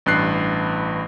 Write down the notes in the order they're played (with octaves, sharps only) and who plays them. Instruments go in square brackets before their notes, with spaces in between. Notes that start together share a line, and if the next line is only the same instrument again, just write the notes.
[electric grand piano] A1 G2 F#6 C7